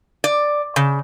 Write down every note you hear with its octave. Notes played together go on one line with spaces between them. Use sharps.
D5
C#3